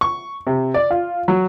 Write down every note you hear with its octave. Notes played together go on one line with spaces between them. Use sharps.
C#6
C3
D5
F4
F#3